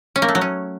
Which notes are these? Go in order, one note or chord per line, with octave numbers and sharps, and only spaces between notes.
C#4
A#3
A3
F#3
C#4